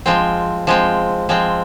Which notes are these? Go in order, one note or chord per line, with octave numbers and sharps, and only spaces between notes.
F3 G#3 C4
F3 G#3 C4
F3 G#3 C4